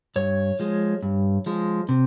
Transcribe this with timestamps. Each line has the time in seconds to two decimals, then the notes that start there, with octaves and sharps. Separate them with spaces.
0.16 G2 C#5
0.59 F3 G#3
1.02 G2
1.46 F3 G#3
1.89 C3